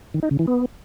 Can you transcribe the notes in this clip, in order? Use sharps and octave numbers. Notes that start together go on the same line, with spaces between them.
D#3
D#4
C#3
E3
B3